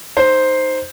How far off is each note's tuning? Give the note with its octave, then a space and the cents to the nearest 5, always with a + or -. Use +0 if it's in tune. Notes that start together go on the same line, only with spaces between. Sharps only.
D#4 +0 C5 +0